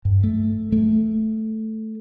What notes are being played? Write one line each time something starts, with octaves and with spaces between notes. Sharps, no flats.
G2
A3
A3